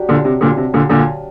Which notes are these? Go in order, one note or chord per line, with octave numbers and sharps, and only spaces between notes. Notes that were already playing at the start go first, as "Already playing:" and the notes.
Already playing: F#3 D4 G4
A#2 D3
C3
A#2 D3
C3
A#2 D3
A#2 D3